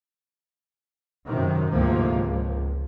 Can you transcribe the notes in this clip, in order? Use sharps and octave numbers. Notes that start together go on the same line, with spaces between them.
F#2 C3 D#3
D2 G#2 C3 F3 A#3
C#2